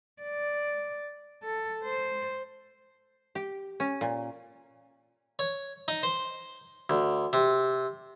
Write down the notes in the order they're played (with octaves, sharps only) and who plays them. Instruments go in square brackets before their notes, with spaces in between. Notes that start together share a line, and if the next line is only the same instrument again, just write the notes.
[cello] D5
A4
C5
[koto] G4
C#4
A#2
[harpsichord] C#5
D#4
C5
D2
C3